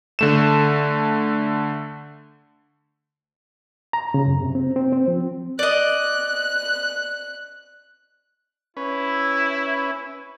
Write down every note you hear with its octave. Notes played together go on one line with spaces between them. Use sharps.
D3 A3 E7
A#5
C#3
F#2
C3
C4
C4
C4
F3
D5 D#5 F#6
C#4 E4 B4